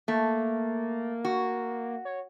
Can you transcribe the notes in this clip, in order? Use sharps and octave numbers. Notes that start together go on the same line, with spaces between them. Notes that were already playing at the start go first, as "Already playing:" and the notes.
A3 A#3
F#4
C#5